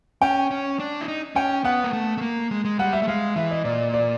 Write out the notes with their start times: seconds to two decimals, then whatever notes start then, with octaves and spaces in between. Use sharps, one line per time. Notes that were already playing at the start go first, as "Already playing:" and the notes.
0.22 C#4 G5
0.51 C#4
0.79 D4
1.01 E4
1.08 D#4
1.35 C#4 G5
1.64 B3 F#5
1.84 A#3
1.93 A3
2.18 A3
2.21 A#3
2.51 G#3
2.65 G#3
2.79 G3 F#5
2.93 E5
3.02 A3
3.08 G#3 F5
3.36 E3 E5
3.51 D#5
3.64 A#2 D5
3.94 D5